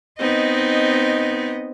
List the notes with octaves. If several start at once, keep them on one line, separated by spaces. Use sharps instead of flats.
B3 C4 D#4 D#5